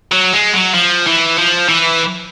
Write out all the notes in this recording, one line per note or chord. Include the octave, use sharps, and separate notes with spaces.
F#3
G#3
F#3
F3
E3
F3
E3